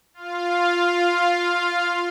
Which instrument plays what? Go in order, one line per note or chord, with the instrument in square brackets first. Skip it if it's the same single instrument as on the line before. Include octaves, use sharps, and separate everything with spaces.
[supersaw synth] F4 F5